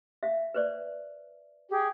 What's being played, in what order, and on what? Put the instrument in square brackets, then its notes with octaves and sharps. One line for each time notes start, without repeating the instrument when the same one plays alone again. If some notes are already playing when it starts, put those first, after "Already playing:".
[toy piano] E5 F5
B4 C5 D5
[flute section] G4 G#4